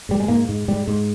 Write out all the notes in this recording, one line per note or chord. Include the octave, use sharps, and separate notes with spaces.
G#2 G3
G#3
G#2 A#3
G#2
G#2 G3
G#2